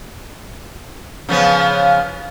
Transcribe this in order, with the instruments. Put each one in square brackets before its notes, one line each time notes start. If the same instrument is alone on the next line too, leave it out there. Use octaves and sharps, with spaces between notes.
[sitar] C#3 F3 B3